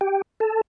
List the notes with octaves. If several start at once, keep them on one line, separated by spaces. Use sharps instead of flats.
G4 G5
A4 A5